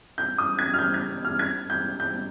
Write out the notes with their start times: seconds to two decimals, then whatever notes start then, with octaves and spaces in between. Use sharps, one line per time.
0.18 G6
0.38 D#6
0.59 G#6
0.74 F6
0.79 G6
0.94 G#6
1.25 F6
1.39 G#6
1.70 G6
2.00 G6